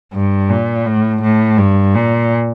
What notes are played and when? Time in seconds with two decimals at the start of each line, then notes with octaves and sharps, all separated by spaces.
0.13 G2
0.50 A#2
0.86 A2
1.22 A2
1.58 G2
1.95 A#2